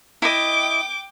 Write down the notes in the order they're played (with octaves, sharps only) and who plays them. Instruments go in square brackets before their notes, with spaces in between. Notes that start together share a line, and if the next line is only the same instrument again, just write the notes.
[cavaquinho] E4 D#5 [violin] G5 D6